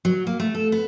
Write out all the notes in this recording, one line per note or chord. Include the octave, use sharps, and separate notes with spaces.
F#3
A#3
A3
A4
B3